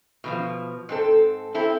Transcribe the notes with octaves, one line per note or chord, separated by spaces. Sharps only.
B2 D#3 F3
G#2 C4 A4
C4 E4 A4